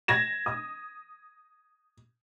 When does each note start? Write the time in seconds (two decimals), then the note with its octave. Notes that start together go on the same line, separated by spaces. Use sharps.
0.08 G#6 A#6 E7
0.46 D#6